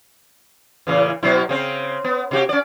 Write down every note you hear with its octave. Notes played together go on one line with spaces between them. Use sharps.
A2 C#3 E3
B2 F#3 E4
C#3 C4
B3
C3 F#4 G4
C#4 D5